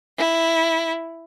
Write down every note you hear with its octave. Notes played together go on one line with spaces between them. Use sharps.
E4